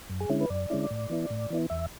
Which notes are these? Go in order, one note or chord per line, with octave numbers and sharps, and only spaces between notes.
F#2
G#4
D3 G#3 C#4 E4
B4
F#2 D5
D3 G#3 C#4 E4
A2
E3 B3 E4
A2
E3 B3 E4
E2 E5